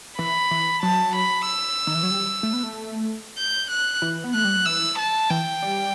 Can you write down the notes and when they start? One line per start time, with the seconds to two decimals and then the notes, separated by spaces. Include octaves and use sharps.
0.19 E3 B5
0.51 E3
0.83 F#3 A5
1.15 B5
1.46 E6
1.87 D#3
1.95 E3
2.03 F#3
2.11 G3
2.43 A3
2.53 B3
2.63 A3
3.38 G6
3.71 F#6
4.02 E3
4.24 B3
4.34 A3 F#6
4.45 G3
4.56 F#3
4.66 E3 E6
4.98 A5
5.30 E3 G5
5.62 G3